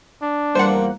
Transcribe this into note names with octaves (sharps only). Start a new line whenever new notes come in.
D4
E2 F3 G3 A#3 C5 F#5